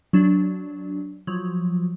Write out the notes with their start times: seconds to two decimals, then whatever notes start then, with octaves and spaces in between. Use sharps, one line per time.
0.13 F#3 D4
1.27 F3 F#3